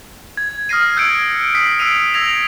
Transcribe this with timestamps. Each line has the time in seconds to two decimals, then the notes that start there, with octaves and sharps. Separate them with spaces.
0.37 G#6
0.69 D#6 F6 G#6 A#6 C7 D#7
0.96 E6 G6 G#6 C#7 D7
1.55 D#6 B6 C7
1.79 E6 C7 D7 D#7 F7
2.14 E6 G#6 A#6 F7